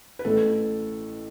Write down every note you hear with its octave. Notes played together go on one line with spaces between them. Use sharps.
B4
A1 A2 E3 A4